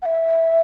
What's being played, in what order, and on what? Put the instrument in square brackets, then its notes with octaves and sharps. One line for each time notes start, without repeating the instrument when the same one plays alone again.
[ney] F#5
E5